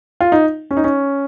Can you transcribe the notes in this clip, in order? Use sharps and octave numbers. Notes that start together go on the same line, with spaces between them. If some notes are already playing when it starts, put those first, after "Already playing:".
F4
D#4
C#4
D#4
C#4